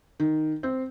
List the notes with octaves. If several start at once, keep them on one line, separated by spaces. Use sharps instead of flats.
D#3
C4